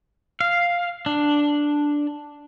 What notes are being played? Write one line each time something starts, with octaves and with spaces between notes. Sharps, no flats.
F5
D4